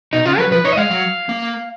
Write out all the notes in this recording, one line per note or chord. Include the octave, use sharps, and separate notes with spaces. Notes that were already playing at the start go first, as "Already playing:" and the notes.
B2 D#4
C#3 F4
F#3 B4
F3 B4
D#4 C#5
D#5
G#3 F5
F#3
A#3